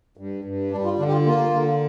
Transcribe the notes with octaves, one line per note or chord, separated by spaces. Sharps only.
G2
G2
G3 D4
F4
D3 D4
G4
F4
A#3 F4
D3